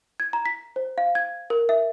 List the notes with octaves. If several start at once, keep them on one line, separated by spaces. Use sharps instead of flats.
G#6
A#5
B6
C5
F5
G#6
A#4
E5